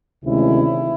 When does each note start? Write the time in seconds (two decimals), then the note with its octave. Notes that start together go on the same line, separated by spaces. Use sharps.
0.24 D2 C3 D#3 G#3 C#4 E4